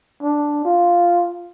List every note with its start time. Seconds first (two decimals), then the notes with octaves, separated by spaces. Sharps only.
0.22 D4
0.65 F4